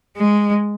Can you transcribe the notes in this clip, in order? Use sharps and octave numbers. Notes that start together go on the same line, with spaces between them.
G#3